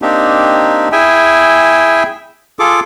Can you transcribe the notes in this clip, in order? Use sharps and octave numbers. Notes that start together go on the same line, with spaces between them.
A#3 C4 D4 D#4 G4
E4 G#4 E5 G5 G#5
F4 G#4 A4 D6